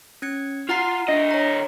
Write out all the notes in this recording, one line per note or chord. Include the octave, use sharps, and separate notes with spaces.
C#4 G#6 C#7
F4 F#5 A#5 C7
D3 D4 D#5 E5
C#5 A#5